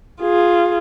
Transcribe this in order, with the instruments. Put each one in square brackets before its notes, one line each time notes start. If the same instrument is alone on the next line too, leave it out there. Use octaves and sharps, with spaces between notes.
[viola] F4 G#4